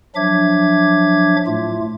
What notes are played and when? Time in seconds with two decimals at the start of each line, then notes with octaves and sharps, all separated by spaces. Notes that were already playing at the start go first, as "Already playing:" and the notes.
0.16 F3 F#3 D4 E5 D6 G#6
1.47 A2 A3 F4